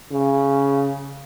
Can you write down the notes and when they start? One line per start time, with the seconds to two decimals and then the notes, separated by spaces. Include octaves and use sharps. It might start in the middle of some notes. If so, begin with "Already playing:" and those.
0.11 C#3